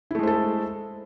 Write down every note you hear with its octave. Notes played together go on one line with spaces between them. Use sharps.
G#3 A3 E4 A4 C5